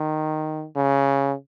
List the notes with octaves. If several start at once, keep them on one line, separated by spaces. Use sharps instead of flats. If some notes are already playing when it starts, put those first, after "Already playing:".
Already playing: D#3
C#3